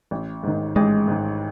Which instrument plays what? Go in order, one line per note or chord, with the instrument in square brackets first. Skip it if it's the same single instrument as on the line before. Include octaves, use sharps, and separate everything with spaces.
[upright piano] A1
G#2 D#3
[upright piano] A1 [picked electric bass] G#3
[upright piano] G#2 D#3